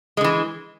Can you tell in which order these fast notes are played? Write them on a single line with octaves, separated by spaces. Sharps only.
G#3 D3 E3